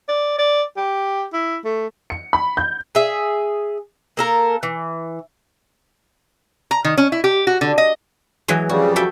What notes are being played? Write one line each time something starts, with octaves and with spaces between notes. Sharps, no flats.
D5
D5
G4
E4
A3
C#7
B5
G6
G#4 E5
A#3 A4 A#4
E3
A#5
D#3
C#4
E4
G4
F#4
D3
D#5
E3 F#3 G#3
F2 C#3 G3 F#4 G#4
F#4 A4 E5 G5